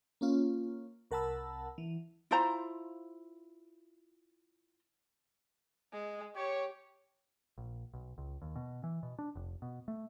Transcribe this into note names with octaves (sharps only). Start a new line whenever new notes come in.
A#3 C#4 F4
C2 A#4 F#5 A5 B5 E6
E3
E4 F4 C5 A#5
G#3
G4 C#5
A#1
B1
C#2
D#2
B2
E3
B2
D4
F1
B2
A3